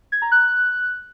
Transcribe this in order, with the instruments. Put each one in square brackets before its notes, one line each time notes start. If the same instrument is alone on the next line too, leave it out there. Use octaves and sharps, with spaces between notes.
[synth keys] G#6
A#5
F#6